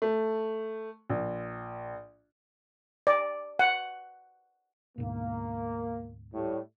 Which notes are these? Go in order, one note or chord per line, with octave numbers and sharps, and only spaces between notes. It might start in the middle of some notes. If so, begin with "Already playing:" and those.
A3
A#1
D5
F#5
D2 G#2 B2 A#3
A2 G3